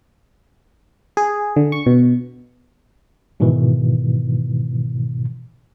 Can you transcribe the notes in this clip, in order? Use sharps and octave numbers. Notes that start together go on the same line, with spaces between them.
G#4
D3
C#6
B2
G#2 B2 D#3 E3